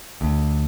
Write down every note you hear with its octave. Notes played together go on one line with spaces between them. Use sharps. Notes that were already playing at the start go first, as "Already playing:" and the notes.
D2